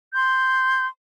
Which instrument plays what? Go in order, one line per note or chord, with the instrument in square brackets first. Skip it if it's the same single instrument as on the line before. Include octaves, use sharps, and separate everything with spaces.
[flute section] C6 G6